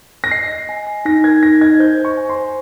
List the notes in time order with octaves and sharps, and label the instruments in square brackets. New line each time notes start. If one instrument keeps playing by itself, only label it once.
[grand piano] A#6
[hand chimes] D#5 [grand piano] C7
[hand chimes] D#5
G#5
G#5
[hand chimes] D#4 [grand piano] A#6
[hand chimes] A#4 [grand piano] G#6
[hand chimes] D#4 [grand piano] A#6
[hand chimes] D#5 [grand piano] G#6
[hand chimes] C5 [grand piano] G6
[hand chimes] C5
[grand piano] C#6
[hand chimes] G#5
[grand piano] C6
[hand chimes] C5